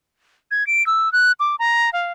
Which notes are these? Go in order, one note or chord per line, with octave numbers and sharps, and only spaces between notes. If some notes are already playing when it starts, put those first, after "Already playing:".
G#6
D7
E6
F#6
D6
A#5
F5